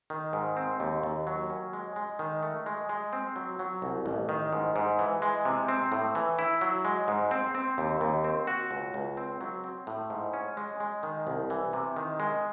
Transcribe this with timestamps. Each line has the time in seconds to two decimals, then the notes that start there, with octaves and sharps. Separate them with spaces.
0.10 D#3
0.33 G#2
0.57 C4
0.80 D#2
1.03 D#2
1.27 F#3
1.50 C#4
1.73 G#3
1.96 G#3
2.19 D#3
2.43 A3
2.66 G#3
2.89 G#3
3.13 C4
3.36 F#3
3.59 F#3
3.82 C2
4.06 A1
4.29 D#3
4.53 G#2
4.76 G#2
4.99 E3
5.22 G#3
5.45 C3
5.68 C4
5.92 A2
6.15 E3
6.39 E4
6.61 F#3
6.85 G#3
7.08 G#2
7.31 C4
7.55 C4
7.78 D#2
8.01 D#2
8.24 C4
8.47 F#4
8.71 C#2
8.94 C#2
9.17 C4
9.41 F#3
9.64 C4
9.87 A2
10.10 G#2
10.33 C#4
10.57 G#3
10.80 G#3
11.03 D#3
11.27 C2
11.50 E3
11.73 C3
11.97 D#3
12.20 G#3